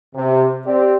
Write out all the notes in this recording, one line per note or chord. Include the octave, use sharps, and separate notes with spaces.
C3
C4 G4 D5